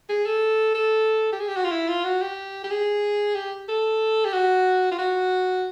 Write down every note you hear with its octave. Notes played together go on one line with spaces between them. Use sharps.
G#4
A4
A4
G4
G#4
G4
F#4
F4
E4
F4
F#4
G4
G4
G#4
G4
A4
G4
F#4
F4
F#4